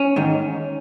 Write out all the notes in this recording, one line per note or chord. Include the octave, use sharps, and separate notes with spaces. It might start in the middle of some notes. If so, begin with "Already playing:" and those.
Already playing: C#4
G#2 D#3